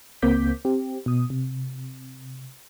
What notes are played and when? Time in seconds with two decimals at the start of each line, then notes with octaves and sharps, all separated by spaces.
0.22 C#2 A#3 C4 D6 G6 B6
0.65 C4 G4
1.06 B2 D#6
1.30 C3